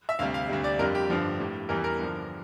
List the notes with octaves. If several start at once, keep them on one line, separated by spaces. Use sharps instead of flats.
E5
D2 C3 G3 F5
F5
D2 C3 G3
D5
F2 D3 G3 A#4
G4
G2 D3 F3
A2 G3
E2 E3 G3 A#4
A#4
G2 D3 F3